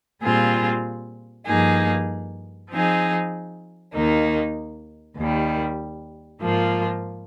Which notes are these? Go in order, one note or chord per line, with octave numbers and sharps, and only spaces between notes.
A#2 G3 C4 F4 G#4
G2 F3 A#3 D#4 G#4
F3 C4 D#4 G#4
D#2 D#3 A#3 D#4
D#2 D#3 G3
G#2 F3 A#3 F4